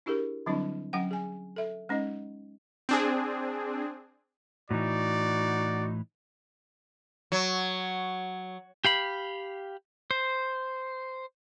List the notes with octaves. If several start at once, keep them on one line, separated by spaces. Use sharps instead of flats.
D4 E4 G4 G#4 A#4
D3 F#3 G3 C4 D4 E4
F#3 C#4 F#5 G5
G#4 G#5
A4 E5
G#3 C#4 D#4 D#5
C4 D4 G#4
A2 E3 D#4 F#4 D5
F#3
G4 F5 B5
C5